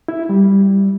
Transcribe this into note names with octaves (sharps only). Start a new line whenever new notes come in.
E4
G3